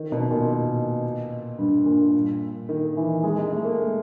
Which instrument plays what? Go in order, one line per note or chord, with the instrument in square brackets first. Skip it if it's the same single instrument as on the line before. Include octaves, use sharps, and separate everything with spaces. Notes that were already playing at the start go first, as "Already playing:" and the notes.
Already playing: [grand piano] D#3
B2
A#2
G2
A#2
D#3
E3
G#3
G#3
A3
A#3